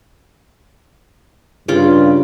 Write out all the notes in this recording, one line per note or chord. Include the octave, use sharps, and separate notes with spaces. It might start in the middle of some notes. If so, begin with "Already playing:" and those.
G2 C#3 F4 D6